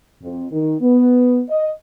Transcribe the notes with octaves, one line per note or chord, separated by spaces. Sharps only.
F2
D#3
B3
D#5